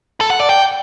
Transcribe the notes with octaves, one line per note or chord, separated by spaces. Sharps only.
A4
F#5
D5
G5